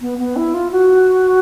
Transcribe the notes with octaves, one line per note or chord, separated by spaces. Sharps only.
B3
B3
E4
F4
F#4